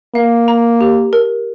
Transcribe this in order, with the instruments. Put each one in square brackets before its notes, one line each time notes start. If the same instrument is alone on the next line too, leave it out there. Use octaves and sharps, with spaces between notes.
[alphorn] A#3 [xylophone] F5
[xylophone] A#5
G4
A#4